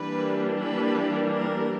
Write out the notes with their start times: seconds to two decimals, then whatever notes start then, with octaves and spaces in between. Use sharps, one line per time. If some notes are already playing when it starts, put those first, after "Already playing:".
Already playing: E3 G3 A#3 D4 B4
0.62 B4
1.35 A#4